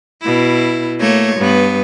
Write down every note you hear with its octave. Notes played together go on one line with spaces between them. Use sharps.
B2 E4
A3 A#3 C#5
G2 B3